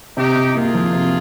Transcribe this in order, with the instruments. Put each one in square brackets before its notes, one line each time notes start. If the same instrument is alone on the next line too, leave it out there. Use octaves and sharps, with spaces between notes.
[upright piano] C3 [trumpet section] D#4 G4
[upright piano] C3
[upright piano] A#3 [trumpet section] F4 G#4
[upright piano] F3
C3